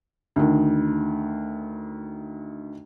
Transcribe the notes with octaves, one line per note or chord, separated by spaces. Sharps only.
D2 D#3